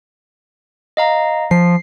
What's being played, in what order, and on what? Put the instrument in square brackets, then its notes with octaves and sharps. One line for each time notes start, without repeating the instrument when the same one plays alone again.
[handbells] D#5 F5 A#5
[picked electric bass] F3 [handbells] C7